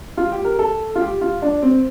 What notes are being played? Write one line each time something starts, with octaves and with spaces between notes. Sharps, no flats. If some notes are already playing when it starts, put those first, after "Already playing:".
F4
G4
A#4
A4
F4
G4
F4
D4
C4